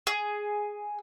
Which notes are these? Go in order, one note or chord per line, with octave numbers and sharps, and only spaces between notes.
G#4